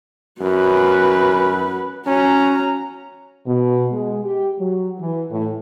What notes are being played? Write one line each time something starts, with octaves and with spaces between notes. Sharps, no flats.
F#2 F#4 B4
C#4 F#4 A#5
B2
G#3
G4
F#3
E3
A2